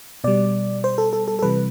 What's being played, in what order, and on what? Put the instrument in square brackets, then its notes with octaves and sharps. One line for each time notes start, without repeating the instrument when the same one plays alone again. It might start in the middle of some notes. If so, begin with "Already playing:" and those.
[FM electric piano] B2 G3 D5
C5
A4
A4
A4
A4
C3 E3 G3 B4